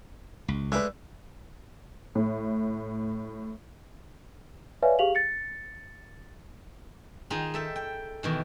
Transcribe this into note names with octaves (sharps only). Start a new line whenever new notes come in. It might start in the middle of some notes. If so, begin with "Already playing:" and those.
C#2
G#3 A3 D4 B4 D6
A2
B4 C#5 D5 E5 F5 G#5
G4 G#4 F5 F7 F#7
A6 C#7
D#3 D#4 F4 G#4
A4 E5 G5
G5
B2 D#3 E3